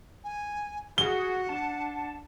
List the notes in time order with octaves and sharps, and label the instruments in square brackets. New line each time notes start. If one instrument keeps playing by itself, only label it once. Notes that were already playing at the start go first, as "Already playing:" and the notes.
[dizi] G#5
[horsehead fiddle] F#4 [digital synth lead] G#4 [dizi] F#5 [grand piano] G7
[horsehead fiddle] D4 [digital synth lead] A5